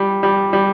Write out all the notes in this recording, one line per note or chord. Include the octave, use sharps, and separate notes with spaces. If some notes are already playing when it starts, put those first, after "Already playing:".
Already playing: G3
G3
G3